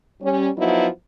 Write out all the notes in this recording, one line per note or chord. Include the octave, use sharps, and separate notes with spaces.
G3 C#4
F3 F#3 B3 D#4 E4 F#4